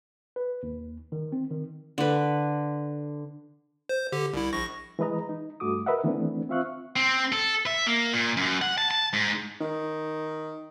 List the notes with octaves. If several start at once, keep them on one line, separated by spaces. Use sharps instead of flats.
B4
D#2
D#3
C4
D#3
D3 B4
C5
D3 G4
C2 E4
A#1 C#6 A#6
E3 G#3 B4 D#5 A#5
D#4
G2 A3 F#4 D6 D#6
A#4 B4 D#5 E5 F#5
D#3 E3 A3 B3 C4 D4
C4 F4 E5 F5 C#6 F#6
C4
A4
E5
A#3
A#2
F#2
F#5
A5
A5
G#2
D#3